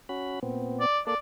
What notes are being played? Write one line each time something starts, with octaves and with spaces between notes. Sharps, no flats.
C#4 F#4 B5
A#2 B3 C4
D5
A#3 A4 D5